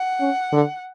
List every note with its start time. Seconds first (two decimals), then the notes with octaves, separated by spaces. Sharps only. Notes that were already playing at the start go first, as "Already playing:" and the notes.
Already playing: F#5
0.20 C#4
0.53 D3